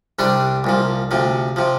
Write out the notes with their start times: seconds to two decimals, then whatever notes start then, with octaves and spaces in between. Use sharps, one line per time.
0.19 C2 C3 G3 D4
0.64 C2 A#2 F3
1.11 D2 C3 F3
1.56 C3 F3